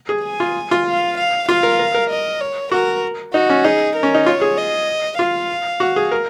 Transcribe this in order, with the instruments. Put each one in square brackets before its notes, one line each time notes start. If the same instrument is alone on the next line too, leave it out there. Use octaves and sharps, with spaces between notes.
[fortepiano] G#4
[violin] G#5
[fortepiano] F4
F4
[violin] F5
F5
[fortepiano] F4 [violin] F5
[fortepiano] A#4
A#4
A#4
[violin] D#5
C#5
[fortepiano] F#4 [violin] A#4
[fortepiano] D#4 [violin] F#4
[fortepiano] C#4
[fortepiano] D#4 [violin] G#4
[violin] A#4
[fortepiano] C#4
D#4
[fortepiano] F4 [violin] C#5
[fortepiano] G#4
[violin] D#5
[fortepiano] F4 [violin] F5
[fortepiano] F#4
G#4
A#4